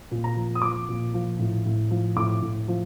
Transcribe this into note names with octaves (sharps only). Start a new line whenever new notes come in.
A#2
A#5
F3
D#6
F3 D6
A#2
F3
A2
A2
F3
A2 D6
A2
F3